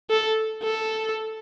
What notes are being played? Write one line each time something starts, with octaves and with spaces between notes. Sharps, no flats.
A4
A4